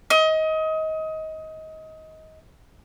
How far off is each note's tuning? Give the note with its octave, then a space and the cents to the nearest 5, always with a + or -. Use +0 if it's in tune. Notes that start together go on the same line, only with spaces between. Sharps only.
D#5 +25